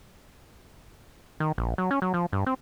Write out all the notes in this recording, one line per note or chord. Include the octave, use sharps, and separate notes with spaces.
D#3
A#1
F#3
C#4
F#3
F3
G2
C4